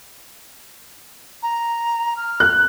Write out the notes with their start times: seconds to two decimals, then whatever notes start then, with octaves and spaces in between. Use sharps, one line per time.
1.42 A#5
2.16 F6
2.40 F#6